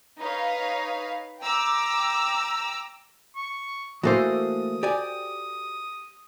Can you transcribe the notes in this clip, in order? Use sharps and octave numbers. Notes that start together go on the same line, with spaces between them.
D#4 B4 C#5 F5
G5 A#5 D6 E6
C#6
E3 A3 A#3 F#4 A4 C5 D#6
G4 D5 G#5